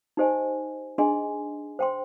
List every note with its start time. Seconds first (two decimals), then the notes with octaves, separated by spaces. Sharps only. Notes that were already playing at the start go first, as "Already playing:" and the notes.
0.17 D#4 G4 C5 D#5 G#5
0.98 D4 G#4 D#5 G#5 C6
1.79 C5 G5 C6